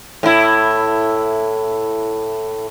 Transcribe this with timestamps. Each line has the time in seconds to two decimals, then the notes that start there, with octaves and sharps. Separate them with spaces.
0.23 A2 E4